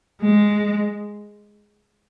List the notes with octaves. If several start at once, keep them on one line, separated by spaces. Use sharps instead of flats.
G#3